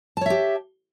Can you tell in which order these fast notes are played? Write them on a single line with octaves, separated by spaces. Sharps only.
A5 C#5 E5 G4